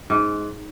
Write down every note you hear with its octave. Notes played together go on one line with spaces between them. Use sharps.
G#2